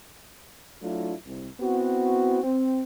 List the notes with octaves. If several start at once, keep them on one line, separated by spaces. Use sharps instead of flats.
F#3 A3 D4 E4 F4
C2
B3 C4 E4 F#4
C4